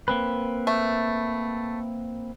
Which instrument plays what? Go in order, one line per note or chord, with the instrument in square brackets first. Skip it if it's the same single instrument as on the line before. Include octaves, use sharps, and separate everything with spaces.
[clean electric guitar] A#3 C4 B4
[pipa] A3